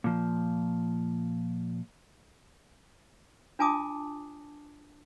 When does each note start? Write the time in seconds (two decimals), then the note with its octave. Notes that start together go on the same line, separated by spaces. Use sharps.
0.04 A#2 F3
3.59 D4 F4 G#5 A5 D6 D#6